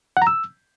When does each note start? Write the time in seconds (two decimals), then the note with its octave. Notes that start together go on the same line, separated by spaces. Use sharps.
0.17 F#5
0.22 A#5
0.27 E6